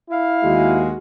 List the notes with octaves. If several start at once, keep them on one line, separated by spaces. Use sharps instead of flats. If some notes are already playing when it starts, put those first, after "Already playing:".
E4 F5
D#2 G#3 F#4